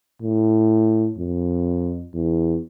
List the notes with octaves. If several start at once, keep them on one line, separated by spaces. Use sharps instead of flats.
A2
F2
E2